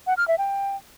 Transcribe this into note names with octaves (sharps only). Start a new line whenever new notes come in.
F#5
F6
E5
G5